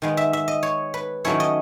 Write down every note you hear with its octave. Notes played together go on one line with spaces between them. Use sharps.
D#3 G#3 B3
E5
E5
D#5
C#5
B4
D#3 F#3 A3 C#4 E4 C#5
D#5